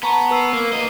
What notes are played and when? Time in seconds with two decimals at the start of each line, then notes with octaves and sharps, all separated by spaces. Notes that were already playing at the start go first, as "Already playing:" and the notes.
0.03 B3 A5 A#5 C#6
0.31 B4 E6 C7
0.53 A#3 C7
0.73 A#3 D#5